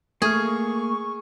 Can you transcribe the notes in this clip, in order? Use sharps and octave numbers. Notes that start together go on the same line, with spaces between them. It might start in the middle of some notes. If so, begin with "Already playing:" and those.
A3 A#3 G#4 C#6 F6